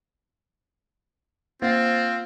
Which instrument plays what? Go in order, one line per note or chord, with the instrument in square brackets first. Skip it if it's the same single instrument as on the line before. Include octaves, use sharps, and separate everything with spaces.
[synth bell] A#3 C5 A6 [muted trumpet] C4 [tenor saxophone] F4